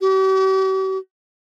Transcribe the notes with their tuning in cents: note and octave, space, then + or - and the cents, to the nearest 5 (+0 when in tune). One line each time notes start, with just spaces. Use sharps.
G4 -45